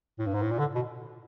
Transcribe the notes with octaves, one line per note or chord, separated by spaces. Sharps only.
A2
G2
G#2
A2
A#2
D3
B2